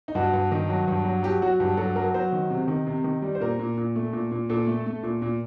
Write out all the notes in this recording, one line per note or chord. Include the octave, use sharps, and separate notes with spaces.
D#4
G2 F#4
G2
D#3
F#3
G2
F#3
F#3 G4
F#3 F#4
G2 G4
F#3 A4
F#3 A#4
A#4
F#3 C5
D#3
C3
D#3
C3
D#3
G3
C5
A#2 A#4
A#2
A#2
A3
A#2
A#2
A#2 A4
A3
A3
A#2
A#2